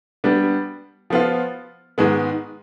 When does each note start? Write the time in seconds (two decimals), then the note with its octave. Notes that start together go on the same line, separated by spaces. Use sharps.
0.24 G3 B3 D4
1.10 F3 B3 F4
1.98 G#2 D#3 G#3 B3